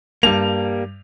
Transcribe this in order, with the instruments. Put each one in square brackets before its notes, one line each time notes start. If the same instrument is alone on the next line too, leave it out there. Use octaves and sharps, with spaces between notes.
[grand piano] G2 F7 [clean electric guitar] G3 A#3